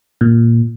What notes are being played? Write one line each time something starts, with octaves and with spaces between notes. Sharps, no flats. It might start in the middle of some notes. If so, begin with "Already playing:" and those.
A#2